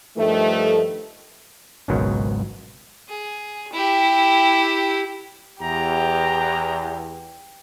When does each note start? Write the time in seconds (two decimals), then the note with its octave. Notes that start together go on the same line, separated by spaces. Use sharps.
0.17 G2 D#3 F3 A3
1.88 G#1 C#2 G#2 B2 D#3 F#3
3.09 G#4
3.73 E4 G4
5.62 E2 G4 A#5